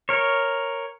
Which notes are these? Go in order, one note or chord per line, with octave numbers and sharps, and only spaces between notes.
A#4 C#5